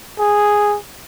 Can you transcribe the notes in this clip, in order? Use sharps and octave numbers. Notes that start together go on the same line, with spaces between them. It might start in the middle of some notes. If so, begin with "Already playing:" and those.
G#4